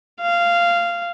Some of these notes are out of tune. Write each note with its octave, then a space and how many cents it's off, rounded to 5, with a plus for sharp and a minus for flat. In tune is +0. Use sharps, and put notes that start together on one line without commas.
F5 -15